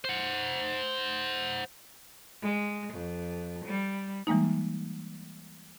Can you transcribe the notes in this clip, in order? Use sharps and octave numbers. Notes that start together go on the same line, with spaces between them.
C5 F#5
G#3
F2
G3
E3 G3 G#3 A#3 D#4